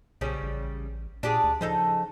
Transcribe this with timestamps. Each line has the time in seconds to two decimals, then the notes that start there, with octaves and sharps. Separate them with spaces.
0.21 B1 C#3 G3 C#4
0.43 A1
1.23 A#2 D4 G4 G#4
1.44 D2
1.61 C#3 F3 D#4 A4